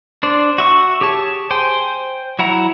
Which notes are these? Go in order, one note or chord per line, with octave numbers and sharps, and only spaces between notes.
D4 C5 D5
F#4 E5 C#6
G4 G#4 C#5 A5
C5 G5 G#5 C6
F#3 E4 F#5 A#5